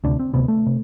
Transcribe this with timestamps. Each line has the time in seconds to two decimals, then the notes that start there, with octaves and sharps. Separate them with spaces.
0.04 D2 C3 D4
0.19 C4
0.33 D2 C3 B3
0.48 A3
0.66 C3